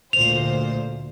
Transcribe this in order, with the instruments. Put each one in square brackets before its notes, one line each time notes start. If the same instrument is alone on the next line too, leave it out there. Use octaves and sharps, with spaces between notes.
[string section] D2 A#2 C5 [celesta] F7